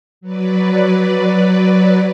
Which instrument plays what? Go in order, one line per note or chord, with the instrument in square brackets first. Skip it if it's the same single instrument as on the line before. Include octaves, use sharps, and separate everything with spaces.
[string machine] F#3 B4 D5